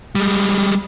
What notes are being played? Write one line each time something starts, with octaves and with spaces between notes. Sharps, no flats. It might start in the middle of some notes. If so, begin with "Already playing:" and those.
G3 G#3